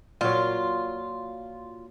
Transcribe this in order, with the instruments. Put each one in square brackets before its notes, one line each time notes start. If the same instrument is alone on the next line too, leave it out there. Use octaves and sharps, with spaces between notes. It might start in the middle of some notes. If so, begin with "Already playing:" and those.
[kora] A#2 F#3 [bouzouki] F4